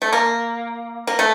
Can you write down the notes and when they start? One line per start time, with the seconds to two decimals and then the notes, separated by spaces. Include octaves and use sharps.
0.02 A3
0.13 A#3
1.07 A#3
1.19 A3